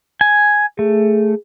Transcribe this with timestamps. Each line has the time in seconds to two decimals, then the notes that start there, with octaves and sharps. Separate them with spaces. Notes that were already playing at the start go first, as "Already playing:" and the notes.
0.21 G#5
0.79 A3 G#4